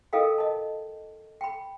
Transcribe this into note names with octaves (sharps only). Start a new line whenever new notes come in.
E4 A4 A#4 D#5 F5 G5
D#5 A5
G5 B5